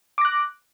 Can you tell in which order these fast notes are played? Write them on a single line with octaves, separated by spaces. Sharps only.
D6 A#6 F#6